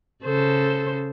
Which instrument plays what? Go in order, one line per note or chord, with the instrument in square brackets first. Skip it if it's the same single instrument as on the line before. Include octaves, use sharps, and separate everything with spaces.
[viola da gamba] C#3 A4 C5